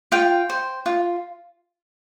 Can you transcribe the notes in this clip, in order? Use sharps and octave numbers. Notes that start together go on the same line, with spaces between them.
F4 G5
C5
F4